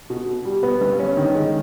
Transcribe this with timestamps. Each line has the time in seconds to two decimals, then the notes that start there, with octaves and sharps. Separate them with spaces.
0.10 B2
0.27 B2
0.45 G3
0.63 B3
0.81 G2
0.99 C#4
1.17 D#3
1.35 G#3